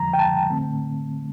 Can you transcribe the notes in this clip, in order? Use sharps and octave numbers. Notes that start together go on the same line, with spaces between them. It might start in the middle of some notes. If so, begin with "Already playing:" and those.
Already playing: F2 D3 F3 A#5
G5
A5
D3 A3 C4